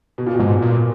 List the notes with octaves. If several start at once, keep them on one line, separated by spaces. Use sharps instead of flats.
B2
A#2
G#2 B2
A#2